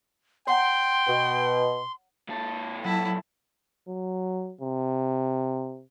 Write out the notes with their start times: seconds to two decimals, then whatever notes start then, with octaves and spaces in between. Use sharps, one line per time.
0.47 C#5 F#5 G5 A#5 C6
1.07 B2
2.29 A#2 A4
2.85 F#3 E4 A5
3.88 F#3
4.61 C3